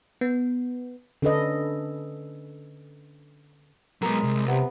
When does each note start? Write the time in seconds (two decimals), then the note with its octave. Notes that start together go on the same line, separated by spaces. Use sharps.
0.21 B3
1.22 D3 C#4 D4 A4 B4 D#5
4.02 F#3 G#3 B3 A#4
4.23 C2
4.48 C3 B3